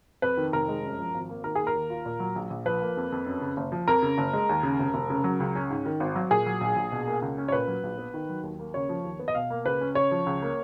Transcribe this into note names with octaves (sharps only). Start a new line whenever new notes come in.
F2 B4
D#3
F1 A#4
G#3
F#2
F3
G#1
A#3
D#3 A#4
A#3 G#4
A#4
D#2
F4
A#2
F#3
A#1
A#1
F3 B4
A#3
F2
F2
F#2
C#3
F#1
F3
F2 A#4
C#3
F#1
G#3
D#2
C#3
F1
F1
C#3
F#3
C#2
C#4
G#2
D#3
G#1
F#3
A#2 G#4
F#3
A#1
A#1
B2
A#3
C#2
C#4
C#5
A#2 B4
F#3
A#1
B3
D#3
F#3
D#2
A#3
C#3 C#5
F3
D#2
B3
D#5
B2 F5
A#3
C#2 B4
C#4
C#3 C#5
F3
C#2
A#3